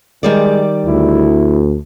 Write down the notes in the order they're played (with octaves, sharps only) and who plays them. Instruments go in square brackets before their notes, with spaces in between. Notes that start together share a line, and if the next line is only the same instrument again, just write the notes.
[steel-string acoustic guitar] D#3 G3 D5 [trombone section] G#3
[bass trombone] D2 [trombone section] E4